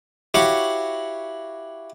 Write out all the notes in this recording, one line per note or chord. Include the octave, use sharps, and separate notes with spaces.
E4 F#4 G4 C#5 F5 F#5